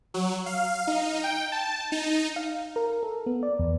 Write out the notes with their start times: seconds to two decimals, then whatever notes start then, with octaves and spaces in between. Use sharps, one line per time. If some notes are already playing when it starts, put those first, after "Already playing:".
0.14 F#3
0.46 F5
0.87 D#4
1.24 G5
1.52 A5
1.92 D#4
2.36 F5
2.76 A#4
3.03 A4
3.26 B3
3.43 D5
3.59 E2